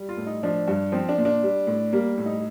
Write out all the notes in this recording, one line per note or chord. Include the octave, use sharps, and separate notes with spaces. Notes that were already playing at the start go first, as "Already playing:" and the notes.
Already playing: G3
F4
A2
D#4
F3 D4
G2
F3 C4
D4
A#2
D4
G3
A2
G3 A#3
A2
D#4